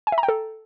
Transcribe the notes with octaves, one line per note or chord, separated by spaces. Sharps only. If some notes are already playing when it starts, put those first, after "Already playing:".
G#5
E5
A#5
G5
A4